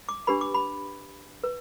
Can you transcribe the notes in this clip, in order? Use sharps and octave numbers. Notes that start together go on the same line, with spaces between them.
D6
D4 G4 B4 B5
D6
B5
B4